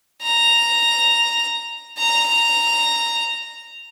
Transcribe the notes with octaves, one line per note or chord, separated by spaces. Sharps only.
A#5
A#5